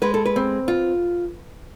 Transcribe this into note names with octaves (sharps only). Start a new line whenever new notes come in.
G#3 B4
A4
B4
C4
F4